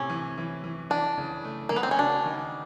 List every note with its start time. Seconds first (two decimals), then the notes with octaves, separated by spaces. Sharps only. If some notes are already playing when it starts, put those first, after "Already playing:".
Already playing: A2 C3 C#4
0.10 E3
0.38 E3
0.64 E3
0.90 E3 D4
1.18 C#3
1.45 A3
1.69 C#3 A#3
1.76 B3
1.83 C4
1.91 C#4
1.98 D4 F#4
2.26 D#3